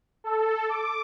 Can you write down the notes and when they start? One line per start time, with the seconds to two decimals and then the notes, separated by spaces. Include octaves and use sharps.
0.24 A4
0.69 D6